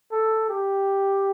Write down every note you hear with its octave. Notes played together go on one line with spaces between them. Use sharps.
A4
G4